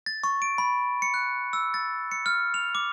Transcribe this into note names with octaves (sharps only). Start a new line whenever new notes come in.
A6
C#6
D7
B5
C#7
F#6
E6
A6
C#7
F6
F7
D6